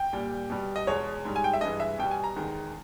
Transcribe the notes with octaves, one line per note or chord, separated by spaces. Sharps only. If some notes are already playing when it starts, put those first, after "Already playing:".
Already playing: G5
A#2 G3
B2 G3
D#5
E2 B2 G#3 C#5
G#2 G3
G#5
G5
E5
G2 E3 G#3 D#5
E5
B2 G3 G5
G#5
A#5
E2 D#3 G#3